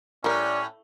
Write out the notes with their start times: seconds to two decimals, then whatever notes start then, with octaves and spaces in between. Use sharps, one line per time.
0.24 A2 G3 C#4 A#4 D5